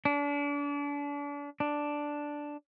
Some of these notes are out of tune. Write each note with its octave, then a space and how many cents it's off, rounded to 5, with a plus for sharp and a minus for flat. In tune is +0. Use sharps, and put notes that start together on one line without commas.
D4 -35
D4 +0